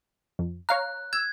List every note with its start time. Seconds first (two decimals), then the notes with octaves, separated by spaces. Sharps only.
0.39 F2
0.69 C#5 F5 A#5 F#6
1.13 E6 G#6